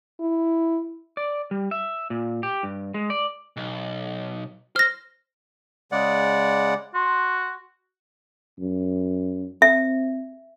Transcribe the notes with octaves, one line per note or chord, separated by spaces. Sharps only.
E4
D5
G3
E5
A#2
G4
G2
G#3
D5
B1
C5 F6 A#6
C#3 G#3 D5 F#5
F#4 C6
F#2
C4 E5